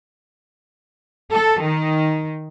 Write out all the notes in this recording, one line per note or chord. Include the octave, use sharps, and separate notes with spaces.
A4
D#3